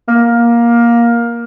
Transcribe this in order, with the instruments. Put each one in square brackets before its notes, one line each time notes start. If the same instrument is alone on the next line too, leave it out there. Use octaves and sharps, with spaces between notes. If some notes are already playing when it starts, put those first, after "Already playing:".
[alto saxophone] A#3